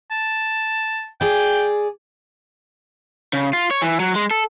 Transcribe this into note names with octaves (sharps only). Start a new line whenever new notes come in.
A5
G#4 D5 G5
C#3
F4
C#5
E3
F#3
G#3
A4